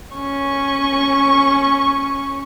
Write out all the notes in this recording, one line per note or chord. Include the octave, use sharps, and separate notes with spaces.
C#4 C#6